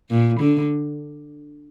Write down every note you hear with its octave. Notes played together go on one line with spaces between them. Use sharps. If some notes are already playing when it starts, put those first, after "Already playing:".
A#2
D3